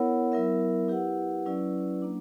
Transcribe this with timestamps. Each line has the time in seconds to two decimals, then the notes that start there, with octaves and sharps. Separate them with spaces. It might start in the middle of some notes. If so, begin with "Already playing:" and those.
Already playing: B3 E4 A#4 C#5 F#5
0.32 F#3 B3 E4 A#4 E5
0.88 E4 G4 B4 F#5
1.46 F#3 C#4 E4 B4 D5
2.02 F#3 A#3 D4